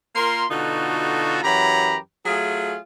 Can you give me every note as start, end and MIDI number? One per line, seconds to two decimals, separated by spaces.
0.15 0.43 58
0.15 0.43 65
0.15 0.43 70
0.15 0.43 84
0.50 1.38 47
0.50 1.38 50
0.50 1.38 63
0.50 1.38 65
0.50 1.38 66
0.50 1.38 69
1.43 1.97 42
1.43 1.97 52
1.43 1.97 54
1.43 1.97 67
1.43 1.97 82
1.43 1.97 83
2.25 2.77 54
2.25 2.77 57
2.25 2.77 65
2.25 2.77 68